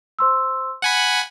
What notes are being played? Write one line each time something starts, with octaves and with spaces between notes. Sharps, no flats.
C5 C6 E6
F#5 G#5 B5 C#7